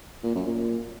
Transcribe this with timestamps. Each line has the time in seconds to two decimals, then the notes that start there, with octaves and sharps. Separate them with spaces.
0.23 A#2
0.35 F#2
0.46 A#2